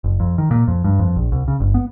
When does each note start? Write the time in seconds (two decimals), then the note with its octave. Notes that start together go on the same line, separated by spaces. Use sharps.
0.04 F#1
0.20 F2
0.38 D#3
0.51 A#2
0.68 F2
0.84 G2
0.99 F2
1.16 A#1
1.32 C2
1.48 C#3
1.60 G1
1.74 B3